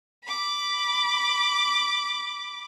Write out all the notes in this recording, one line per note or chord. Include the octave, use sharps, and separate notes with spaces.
B5 D6